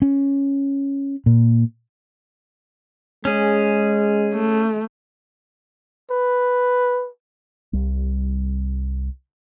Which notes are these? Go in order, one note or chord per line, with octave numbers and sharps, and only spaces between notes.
C#4
A#2
G#3 C#4 G#4
A3
B4
C2 G3